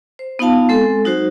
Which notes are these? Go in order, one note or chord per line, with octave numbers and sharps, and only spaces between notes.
C5
B3 D#4 F4 F5 A5
G#3 C4 A4
F#3 D#4 F#4 C5